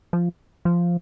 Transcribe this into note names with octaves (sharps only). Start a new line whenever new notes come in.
F3
F3